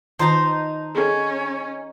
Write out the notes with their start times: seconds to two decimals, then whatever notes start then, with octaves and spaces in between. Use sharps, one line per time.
0.19 D#3 D#4 F4 C5 A5 A#5
0.95 C#4 G#4 A4